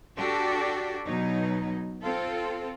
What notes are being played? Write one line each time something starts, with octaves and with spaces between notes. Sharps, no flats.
D4 F#4 G4 A4
B2 F#3 D#4
C4 F4 A4